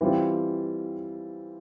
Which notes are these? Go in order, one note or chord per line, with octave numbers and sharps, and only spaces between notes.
E3 G3 C4 F4